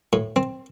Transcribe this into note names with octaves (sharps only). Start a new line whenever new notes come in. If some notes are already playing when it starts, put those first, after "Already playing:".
A2
C4